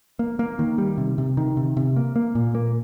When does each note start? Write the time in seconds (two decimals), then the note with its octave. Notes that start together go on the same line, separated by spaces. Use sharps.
0.19 A#3
0.39 A#3
0.59 D#3
0.78 G3
0.98 C3
1.18 C3
1.37 D#3
1.57 C3
1.77 C3
1.96 A#3
2.16 A#3
2.35 A#2
2.55 A#3